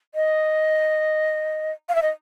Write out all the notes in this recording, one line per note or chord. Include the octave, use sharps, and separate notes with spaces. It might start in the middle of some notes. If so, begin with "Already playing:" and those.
D#5
F5
E5
D#5